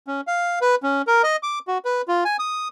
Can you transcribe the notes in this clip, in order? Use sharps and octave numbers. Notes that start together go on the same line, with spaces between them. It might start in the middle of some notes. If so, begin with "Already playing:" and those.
C#4
F5
B4
C#4
A#4
D#5
D6
F#4
B4
F4
G#5
D#6